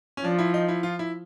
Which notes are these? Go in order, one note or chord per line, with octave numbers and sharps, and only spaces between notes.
C#4
F3 D4
E4
D#4
E4
F4
E4